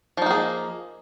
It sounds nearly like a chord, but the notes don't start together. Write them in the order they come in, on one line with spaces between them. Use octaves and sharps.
F3 D#4 A#3 G#4